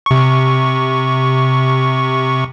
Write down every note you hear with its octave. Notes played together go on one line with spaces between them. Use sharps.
C3 C#6